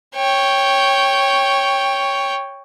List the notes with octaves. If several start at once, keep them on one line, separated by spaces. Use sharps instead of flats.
C#5 G5